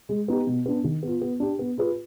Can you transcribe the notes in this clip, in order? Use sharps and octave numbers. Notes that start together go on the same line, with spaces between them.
G#3
B3 D#4 G4
B2
B3 D4
D#3
B3 F4
B3
D4 G4
B3
F4 G#4 B4